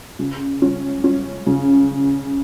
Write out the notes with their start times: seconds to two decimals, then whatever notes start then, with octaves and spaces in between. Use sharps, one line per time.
0.19 C#3
0.62 C#4
1.04 C#4
1.47 C#3